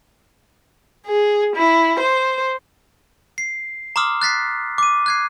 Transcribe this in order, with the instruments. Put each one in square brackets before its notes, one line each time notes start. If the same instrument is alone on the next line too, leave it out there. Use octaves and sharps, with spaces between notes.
[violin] G#4
E4
C5
[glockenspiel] C7
A#5 C6 D6 D#6 F6
F#6 A6 B6 C7
D6 D#7
F#6 G#6 C7